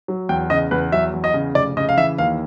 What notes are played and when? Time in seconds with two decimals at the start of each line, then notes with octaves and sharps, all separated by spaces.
0.08 F#3
0.29 E2 G5
0.50 C#3 D#5
0.71 E2 B4
0.92 F#3 E5
1.13 E2
1.24 D#5
1.34 C#3
1.55 F1 D5
1.77 C#3 D#5
1.89 F5
1.97 E3 E5
2.18 D#2 F5